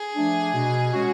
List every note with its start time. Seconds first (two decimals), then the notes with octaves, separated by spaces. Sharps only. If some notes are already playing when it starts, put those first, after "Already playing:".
Already playing: G#4
0.15 F3 A3 D4
0.54 B2
0.93 G#3 C#4 F#4